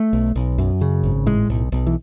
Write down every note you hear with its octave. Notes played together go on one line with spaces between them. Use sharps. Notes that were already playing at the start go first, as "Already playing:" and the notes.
Already playing: A3
B1
B1
F#2
C#3
G#1
A2 G#3
B1
B1
E3